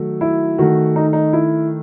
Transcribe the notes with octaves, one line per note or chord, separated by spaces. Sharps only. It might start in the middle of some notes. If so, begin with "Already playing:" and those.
Already playing: D#3 F#3 A3
E4
D#3 A3 F#4
D#4
D#4
E4